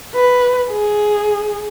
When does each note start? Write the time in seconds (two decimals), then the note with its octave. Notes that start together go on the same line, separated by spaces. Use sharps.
0.15 B4
0.71 G#4